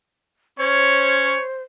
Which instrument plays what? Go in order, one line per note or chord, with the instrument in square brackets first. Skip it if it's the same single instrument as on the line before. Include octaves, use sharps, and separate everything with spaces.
[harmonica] C#4 [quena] C5 [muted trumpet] C#5